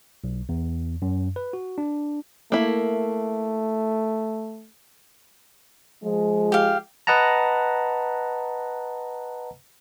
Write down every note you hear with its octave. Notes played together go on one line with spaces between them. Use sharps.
B1
E2
F#2
B4
F#4
D4
A3 A#3 E4
F3 G#3
G4 F5
B4 D#5 F#5 A5 A#5